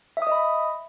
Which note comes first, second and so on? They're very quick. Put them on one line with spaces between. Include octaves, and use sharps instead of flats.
E5 D#6 D#5 B5